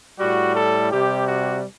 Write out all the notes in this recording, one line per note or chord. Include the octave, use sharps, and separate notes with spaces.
A2 G3 F#4
A4
C3 G3 G4
F#4